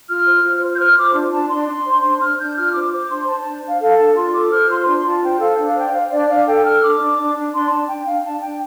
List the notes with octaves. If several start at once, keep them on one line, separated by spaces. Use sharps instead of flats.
F4 F6
C5
F4
C5
G6
C5 F6
F4 D6
D4
D4 A5
D4 C6
D4
C5
D4
D4 F6
D4 G6
F4 F6
C5 D6
C5 D6
D4 C6
C5 A5
D4 A5
D4 F5
A4 F5
D4 A5
F4 C6
A4 D6
C5 F6
F4 C6
D4 C6
F4 A5
C5 G5
A4 F5
D4
F5
C5 G5
C5 F5
D4 D5
D4 F5
A4 G5
A4 F6
D4 D6
D4
D4
D4
D4 C6
D4 A5
D4 G5
D4 F5
D4 A5
D4 G5